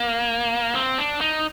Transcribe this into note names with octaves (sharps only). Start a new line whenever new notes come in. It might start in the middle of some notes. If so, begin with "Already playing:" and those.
Already playing: A#3
C4
D4
D#4